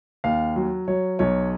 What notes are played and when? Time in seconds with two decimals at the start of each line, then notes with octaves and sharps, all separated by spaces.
0.24 D#2 F5
0.56 F#3
0.88 F#3 C#5
1.19 B1 C#5